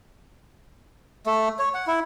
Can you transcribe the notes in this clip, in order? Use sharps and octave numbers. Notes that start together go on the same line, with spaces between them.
A3
C#5
F#5
E4